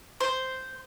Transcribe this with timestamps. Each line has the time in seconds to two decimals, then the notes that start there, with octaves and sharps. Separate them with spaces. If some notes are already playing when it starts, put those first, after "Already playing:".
0.20 C5